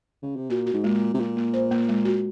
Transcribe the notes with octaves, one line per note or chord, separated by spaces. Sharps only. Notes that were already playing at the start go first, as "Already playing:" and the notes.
C#3
C3
A#2 F#4
F#4
G#2
A#2 G#3
G#3
C3
A#2 A#3
A#3
C5
A#3
G#3
F#4